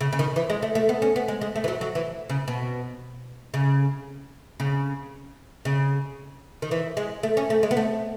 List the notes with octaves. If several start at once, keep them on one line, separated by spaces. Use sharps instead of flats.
C#3
C#3
D#3
E3
G#3
A3
A3
B3
C#4
B3
G#3
G#3
A3
E3
F#3
F#3
E3
C#3
B2
C#3
C#3
C#3
D#3
E3
G#3
A3
C#4
A3
G#3
B3
A3